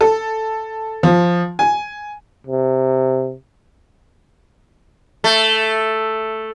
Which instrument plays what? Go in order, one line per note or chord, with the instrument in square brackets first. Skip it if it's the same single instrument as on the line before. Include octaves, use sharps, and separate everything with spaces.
[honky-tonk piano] A4
F3
G#5
[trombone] C3
[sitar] A3